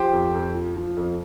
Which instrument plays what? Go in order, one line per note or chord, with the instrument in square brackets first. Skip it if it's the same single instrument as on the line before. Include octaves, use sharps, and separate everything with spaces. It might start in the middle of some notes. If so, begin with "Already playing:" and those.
Already playing: [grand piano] F3 G4 C5
F2
F2
F3
F3
F2